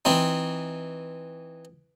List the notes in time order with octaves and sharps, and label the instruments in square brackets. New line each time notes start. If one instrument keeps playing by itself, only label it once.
[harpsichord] E3 C4 D#4